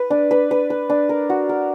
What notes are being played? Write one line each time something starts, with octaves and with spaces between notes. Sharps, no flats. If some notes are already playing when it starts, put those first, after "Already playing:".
Already playing: B4
D4
B4
B4
B4
D4
A#4
F#4
A#4